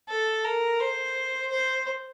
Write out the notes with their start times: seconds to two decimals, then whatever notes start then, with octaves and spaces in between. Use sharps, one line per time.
0.09 A4
0.45 A#4
0.80 C5
1.51 C5